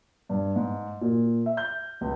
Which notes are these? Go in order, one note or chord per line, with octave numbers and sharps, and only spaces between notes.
G2
G#2
A#2
E5
G6
C#2